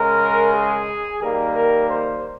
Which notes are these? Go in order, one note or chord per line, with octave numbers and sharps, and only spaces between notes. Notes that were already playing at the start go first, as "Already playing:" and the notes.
Already playing: C#3 G#3 A#4
G#4
D#3 G3 A#3 A#4
A#4
C5